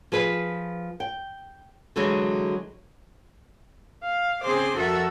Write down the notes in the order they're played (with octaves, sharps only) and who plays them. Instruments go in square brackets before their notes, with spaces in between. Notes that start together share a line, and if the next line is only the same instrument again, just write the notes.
[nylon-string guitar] F3 G#4 B4
G5
D3 E3 F#3 G#3
[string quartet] F5
C#3 C4 G#4 C5 C6 D6
F2 F#4 A4 A#4 E5 F#5